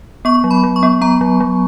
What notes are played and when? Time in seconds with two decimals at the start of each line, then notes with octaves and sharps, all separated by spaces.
0.25 B3 C#6
0.44 F#3
0.51 B5
0.63 F#3
0.76 C#6
0.83 B3
1.01 B3 A#5
1.21 F#3
1.40 F#3